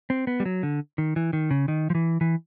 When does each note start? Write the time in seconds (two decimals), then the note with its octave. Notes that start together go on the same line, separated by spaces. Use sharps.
0.10 C4
0.27 B3
0.40 G3
0.46 F#3
0.63 D3
0.98 D#3
1.16 E3
1.33 D#3
1.51 C#3
1.68 D#3
1.90 F3
1.95 E3
2.21 E3